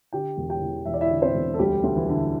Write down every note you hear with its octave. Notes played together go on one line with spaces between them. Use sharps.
D3 G4 G5
E1
G4 G5
E2
E1 E5
D5
E4 E5
D3
C4 C5
E1
A4
D2 G3 G4
D2
E3 E4
D3